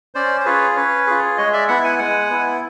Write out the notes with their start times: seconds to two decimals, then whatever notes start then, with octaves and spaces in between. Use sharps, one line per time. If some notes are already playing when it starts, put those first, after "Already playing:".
0.15 C#4 C5 D5
0.40 C5
0.45 F4 G#4 B4 C#5
0.76 C#4 B4 C#5
1.07 F4 G#4
1.37 G#3 C#5 D#5
1.53 D5 E5
1.68 B3 E4 E5 F#5
1.84 F#5 G#5
1.99 G#3 F#5 G#5
2.30 B3 E4